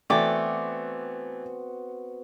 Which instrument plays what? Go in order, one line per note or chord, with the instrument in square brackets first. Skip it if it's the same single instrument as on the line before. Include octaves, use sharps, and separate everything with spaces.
[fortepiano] E3 A3 [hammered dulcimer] B3 C4 F#4 [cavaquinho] D5 G5 D6